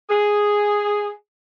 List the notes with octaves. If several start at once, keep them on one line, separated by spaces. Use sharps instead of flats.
G#4